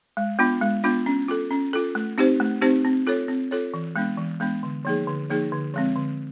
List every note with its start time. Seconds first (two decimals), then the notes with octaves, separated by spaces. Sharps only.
0.17 G#3
0.39 B3 D4 F4
0.61 G#3
0.84 B3 D4 F4
1.06 C#4
1.28 F4 A4
1.51 C#4
1.73 F4 A4
1.95 A3
2.18 C4 D#4 G4 C5
2.40 A3
2.62 C4 D#4 G4 C5
2.85 C4
3.07 F4 A4 C#5
3.28 C4
3.51 F4 A4 C#5
3.74 E3
3.96 G#3 B3 D4
4.17 E3
4.40 G#3 B3 D4
4.63 D3
4.85 F3 A#3 D#4 G#4
5.08 D3
5.30 F3 A#3 D#4 G#4
5.52 D3
5.74 F3 G#3 C4
5.96 D3